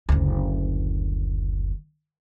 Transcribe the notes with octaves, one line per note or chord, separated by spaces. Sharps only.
F#1 D2